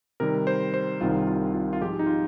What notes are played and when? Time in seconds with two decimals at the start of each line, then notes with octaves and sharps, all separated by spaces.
0.20 C3 D#3 G3 A#4
0.47 C5
0.74 C5
1.01 C2 C3 D#3 G3 C4 F4
1.28 F4
1.54 F4
1.73 F4
1.81 G#2 F3 G#3 C4 D#4 G4
1.99 D#4
2.07 F4